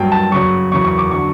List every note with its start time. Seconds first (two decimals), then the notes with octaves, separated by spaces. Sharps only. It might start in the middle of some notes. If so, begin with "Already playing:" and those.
Already playing: G2 F#3 G5
0.12 A5
0.31 F#2 C#3 F#3 C#6
0.71 E2 C#3 F#3 C#6
0.84 C#6
0.98 D6
1.11 D3 F#3 C#6